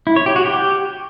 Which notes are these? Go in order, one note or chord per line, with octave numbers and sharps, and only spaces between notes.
E4
C#5
G4
F#4
G4